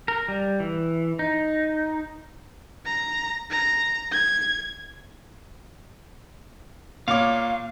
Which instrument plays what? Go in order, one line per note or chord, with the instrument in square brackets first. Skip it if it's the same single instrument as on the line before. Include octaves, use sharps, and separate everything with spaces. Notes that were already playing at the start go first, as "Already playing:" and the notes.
[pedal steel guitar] A#4
G3
E3
D#4
[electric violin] A#5
A#5
G#6
[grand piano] A#2 C#5 D6 [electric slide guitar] F5